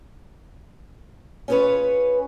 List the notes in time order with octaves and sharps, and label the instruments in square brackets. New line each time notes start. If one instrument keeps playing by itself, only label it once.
[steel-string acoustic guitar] C#4 F4 G#4 A#4 B4 C#5